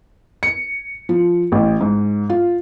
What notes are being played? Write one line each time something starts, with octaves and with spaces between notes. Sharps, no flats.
C#7
F3
A1
G#2
F4